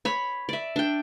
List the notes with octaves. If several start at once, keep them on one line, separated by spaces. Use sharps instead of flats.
C#5 B5
D5 E5
D4 G5